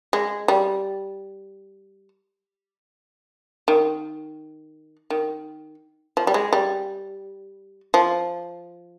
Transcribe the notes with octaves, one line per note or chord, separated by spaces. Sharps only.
G#3
G3
D#3
D#3
F3
G3
G#3
G3
F3